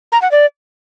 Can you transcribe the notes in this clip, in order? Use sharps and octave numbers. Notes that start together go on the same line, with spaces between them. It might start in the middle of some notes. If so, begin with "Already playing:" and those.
A#5
F#5
D5